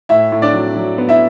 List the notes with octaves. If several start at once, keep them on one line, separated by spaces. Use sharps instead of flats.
A2 E4 E5
A2
D4 D5
F#3
F#3
B3
E4 E5